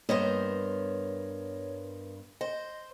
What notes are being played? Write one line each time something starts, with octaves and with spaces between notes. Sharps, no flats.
G2 A#3 B3 A#4 C5 C#5 D#5
C5 D#5